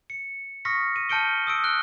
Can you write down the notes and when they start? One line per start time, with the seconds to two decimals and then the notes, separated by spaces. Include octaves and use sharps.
0.10 C#7
0.65 C#6 D#6 F6 A#6 B6 C#7
0.96 D#7
1.09 A5 F6 G6 C#7 D7 G7
1.47 D#6 E6 D7
1.64 F6 F#6 G7